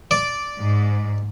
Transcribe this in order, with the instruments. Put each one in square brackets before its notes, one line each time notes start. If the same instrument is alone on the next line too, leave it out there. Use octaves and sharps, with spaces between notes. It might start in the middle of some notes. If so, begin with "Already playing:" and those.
[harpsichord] D5
[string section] G#2